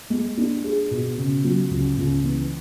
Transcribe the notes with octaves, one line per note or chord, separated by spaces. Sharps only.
G#3
D4
G#4
B2
C#3
F#3
C#2
C#2
E3